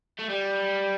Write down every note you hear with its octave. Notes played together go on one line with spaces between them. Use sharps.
A3
G3